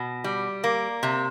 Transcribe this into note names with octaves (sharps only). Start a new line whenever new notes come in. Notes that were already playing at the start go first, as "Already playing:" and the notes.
Already playing: B2
G3
A#3
C3